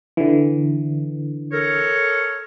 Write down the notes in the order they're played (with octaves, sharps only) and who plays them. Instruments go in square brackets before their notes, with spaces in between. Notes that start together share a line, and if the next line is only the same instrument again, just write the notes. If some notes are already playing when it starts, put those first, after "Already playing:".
[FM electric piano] D3 E3
[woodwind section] A4 A#4 C#5